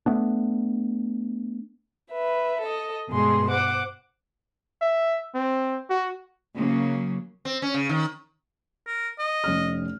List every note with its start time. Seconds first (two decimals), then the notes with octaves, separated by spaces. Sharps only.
0.06 A3 B3 D4
2.11 B4 E5
2.62 A4 D#5
3.09 G2 B2 G#3 G#4 C6
3.50 C5 F#5 D6
4.82 E5
5.35 C4
5.90 F#4
6.56 C#3 F#3 A#3
7.45 C4
7.62 C#4
7.74 C#3
7.89 D#3
8.86 A#4
9.19 D#5
9.44 F1 C#4 F6